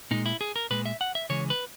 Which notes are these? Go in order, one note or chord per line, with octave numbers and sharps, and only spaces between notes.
A#2 G#3 D#4
E4
G#4
A#4
A#2 G#3 B4
E5
F#5
E5
C#3 E3 G#3 C#5
B4